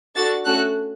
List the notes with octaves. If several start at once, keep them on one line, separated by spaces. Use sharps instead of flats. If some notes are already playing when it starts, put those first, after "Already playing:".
D4 F#4 A4 A6
A3 C#4 F#4 A4 F#6